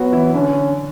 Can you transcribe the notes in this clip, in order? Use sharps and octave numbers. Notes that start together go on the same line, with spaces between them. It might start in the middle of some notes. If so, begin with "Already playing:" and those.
Already playing: F#3 B3 F#4
E3 E4
D3 C#4 D4